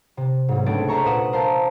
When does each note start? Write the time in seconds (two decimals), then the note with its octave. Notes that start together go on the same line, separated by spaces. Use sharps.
0.17 C3
0.48 B1 G#2
0.66 C#2 A3 C4 D4 A6 D7
0.88 C5 D5 E5 A#5 C#6
1.05 A#2 B4 F#5 D6 D#6 E7
1.33 A#4 C5 F5 A5 A#5